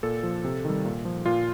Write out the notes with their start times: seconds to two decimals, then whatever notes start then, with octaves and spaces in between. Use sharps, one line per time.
0.03 A#2 A4
0.23 F3
0.45 C3
0.65 D#3 G3
0.85 A#2
1.05 F3
1.26 A#2 F4